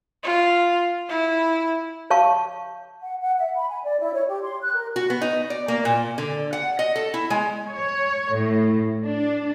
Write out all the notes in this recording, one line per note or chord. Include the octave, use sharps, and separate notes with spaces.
F4
E4
C#5 F5 A5 C#6
F#5
F#5
E5
B5
G#5
D5
E4
C#5
G4
C6
F#6
A#4
F#4
B3
D#4
D5
A#3
A#2
D3
F#5
D#5
A4
E4
G#3
C#5
A2
D4